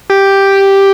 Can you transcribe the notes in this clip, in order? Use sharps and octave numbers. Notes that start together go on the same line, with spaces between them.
G4